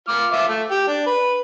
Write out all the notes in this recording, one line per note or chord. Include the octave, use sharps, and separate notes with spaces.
F4 D6 F6
F4 E5 D6
A3
G4
D4
B4